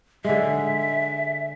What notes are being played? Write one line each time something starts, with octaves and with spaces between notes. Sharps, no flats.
D3 G#3 E5